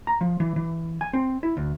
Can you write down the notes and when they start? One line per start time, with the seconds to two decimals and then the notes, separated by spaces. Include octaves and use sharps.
0.07 A#5
0.21 F3
0.40 E3
0.56 E3
1.01 G#5
1.13 C4
1.43 E4
1.57 D2